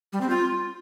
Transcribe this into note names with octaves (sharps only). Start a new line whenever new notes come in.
G3
C4
F4